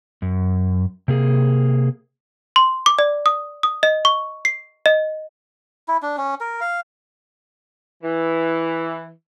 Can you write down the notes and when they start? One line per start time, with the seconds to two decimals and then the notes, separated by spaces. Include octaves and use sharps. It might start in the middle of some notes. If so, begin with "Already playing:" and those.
0.22 F#2
1.08 C3 A#3 G#4
2.56 C6
2.86 D6
2.99 D5
3.26 D#6
3.63 D#6
3.83 D#5
4.05 C#6
4.45 C7
4.86 D#5
5.88 E4
6.02 D4
6.17 C#4
6.41 A#4
6.61 F5
8.03 E3